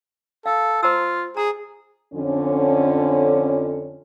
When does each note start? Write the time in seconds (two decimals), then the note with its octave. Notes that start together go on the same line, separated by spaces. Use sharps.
0.46 A4 F5
0.83 F4 C5 A#5 E6
1.37 G#4 A#5
2.14 F2 D3 C#4